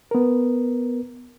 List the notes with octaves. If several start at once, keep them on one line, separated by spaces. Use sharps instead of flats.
B3 A#4